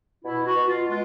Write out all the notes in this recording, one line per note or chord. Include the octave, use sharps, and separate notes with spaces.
B2 E4
F#4
B2
F4
G#3 F4